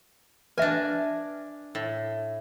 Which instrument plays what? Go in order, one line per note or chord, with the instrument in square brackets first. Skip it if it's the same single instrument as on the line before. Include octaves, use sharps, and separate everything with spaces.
[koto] D4 G#5 [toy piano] B4 E5
[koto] A2